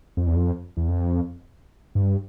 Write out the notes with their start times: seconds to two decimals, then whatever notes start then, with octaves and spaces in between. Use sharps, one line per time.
0.17 F2
0.27 E2
0.36 F2
0.77 E2
0.88 F2
1.95 G2